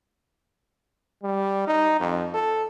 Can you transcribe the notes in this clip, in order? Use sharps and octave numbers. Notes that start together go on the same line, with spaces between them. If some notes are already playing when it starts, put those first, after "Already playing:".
G3
D#4
F2
A4